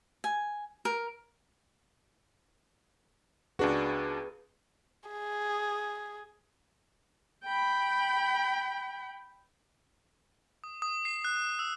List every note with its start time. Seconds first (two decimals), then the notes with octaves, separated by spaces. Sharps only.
0.24 G#5
0.85 A#4
3.59 C#2 D4 F#4 G#4 B4
5.10 G#4
7.44 G5 B5
10.64 D#6
10.82 D#6
11.05 C7
11.25 F#6
11.59 E6